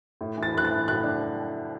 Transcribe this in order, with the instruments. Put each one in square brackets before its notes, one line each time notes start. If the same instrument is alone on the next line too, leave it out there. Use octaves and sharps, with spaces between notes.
[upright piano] A2
E3 A6
A2 F#6
A6
E3
A2 F#6
D4